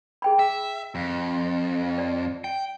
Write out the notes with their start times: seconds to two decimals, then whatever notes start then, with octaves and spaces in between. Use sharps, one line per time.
0.22 G#4 G5 B5
0.39 E5
0.95 F2
1.98 D5
2.44 G5